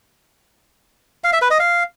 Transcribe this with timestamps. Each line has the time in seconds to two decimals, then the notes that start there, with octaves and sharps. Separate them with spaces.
1.24 F5
1.33 E5
1.42 B4
1.51 D#5
1.59 F5